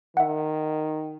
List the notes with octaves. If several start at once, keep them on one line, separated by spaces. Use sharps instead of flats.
D#3 E5 F#5